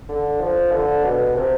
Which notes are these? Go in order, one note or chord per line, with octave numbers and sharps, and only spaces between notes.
D3
F3
D3
B2
C3